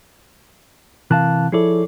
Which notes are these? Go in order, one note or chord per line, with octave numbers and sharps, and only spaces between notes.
C3 E3 A#4 F5 A5 F#6
F3 E4 G#4 A4 C#5 D5